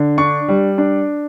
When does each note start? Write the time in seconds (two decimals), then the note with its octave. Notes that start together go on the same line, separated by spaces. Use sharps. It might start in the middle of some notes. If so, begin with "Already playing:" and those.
Already playing: D3
0.18 D4 C#6
0.48 G3
0.78 D4